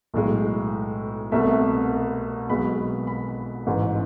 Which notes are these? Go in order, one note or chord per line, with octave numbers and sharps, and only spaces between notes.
B1 A2 G#3
C2 B2 A3 E5
B1 B2 G#3 B5
B5
A1 G#2 E3